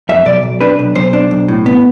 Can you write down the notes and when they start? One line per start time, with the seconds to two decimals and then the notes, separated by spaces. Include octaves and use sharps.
0.09 F2 E5
0.25 B1 D5
0.43 B1
0.61 D4 B4
0.79 B1
0.95 B1 C5
1.13 D4
1.31 B1
1.48 A2
1.66 B3